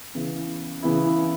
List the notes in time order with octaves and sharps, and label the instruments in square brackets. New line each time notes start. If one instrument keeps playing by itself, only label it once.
[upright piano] C#3 E3 B3 E4
C#3 E3 B3 E4